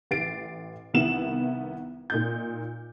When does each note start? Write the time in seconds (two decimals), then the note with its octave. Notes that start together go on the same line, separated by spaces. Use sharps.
0.11 A1 A6 C7 D7
0.94 C2 D#3 B3 E4 E7 F#7
2.10 A#2 D#4 G6